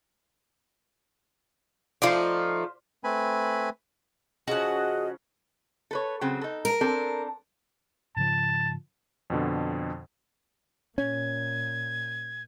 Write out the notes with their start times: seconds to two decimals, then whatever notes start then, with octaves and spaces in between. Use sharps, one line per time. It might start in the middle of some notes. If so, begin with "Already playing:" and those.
2.02 F3 A3 D#4 F4 C5 D5
3.04 A3 C4 B4 G#5 B5
4.48 C#3 F3 C#4 F#4 G#4 D#5 F#5
5.91 A4 B4 C#5
6.21 C#3 F#3 C4
6.41 D#4 A4
6.65 A#4
6.81 C4 D4 A4
8.16 G#2 C#3 F3 A5
9.30 F2 B2 D3
10.98 A#2 C#4 G#6